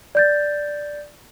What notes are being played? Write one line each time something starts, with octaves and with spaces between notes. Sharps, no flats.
D5 G6 A6